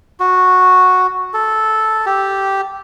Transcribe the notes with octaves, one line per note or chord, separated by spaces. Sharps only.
F#4
A4
G4